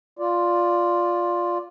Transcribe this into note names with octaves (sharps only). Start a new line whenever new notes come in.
F4 D5